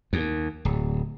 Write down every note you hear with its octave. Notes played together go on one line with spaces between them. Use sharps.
D#2
D1